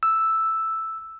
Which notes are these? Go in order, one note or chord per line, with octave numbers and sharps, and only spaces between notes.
E6